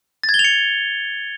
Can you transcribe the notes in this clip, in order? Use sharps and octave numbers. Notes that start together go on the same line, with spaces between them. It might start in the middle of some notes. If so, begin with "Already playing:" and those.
A6
G#6
G7
F7
C#7